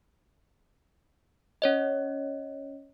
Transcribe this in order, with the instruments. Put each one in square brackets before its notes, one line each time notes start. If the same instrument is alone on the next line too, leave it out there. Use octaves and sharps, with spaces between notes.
[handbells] C#4 C#5 D#5